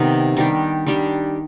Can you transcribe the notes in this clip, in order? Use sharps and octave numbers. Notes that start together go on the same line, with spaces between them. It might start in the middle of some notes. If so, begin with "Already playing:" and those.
Already playing: C3 D#3 B3
D#3 G3 D4 G4
D#3 G3 D4 G4